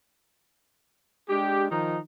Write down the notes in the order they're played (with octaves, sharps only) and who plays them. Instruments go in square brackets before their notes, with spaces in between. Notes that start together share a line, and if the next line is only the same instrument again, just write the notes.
[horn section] G#3 D4 G4
D#3 F3 D#4